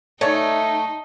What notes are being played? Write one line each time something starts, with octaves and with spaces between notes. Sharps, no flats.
A3 D#4 C#5 D5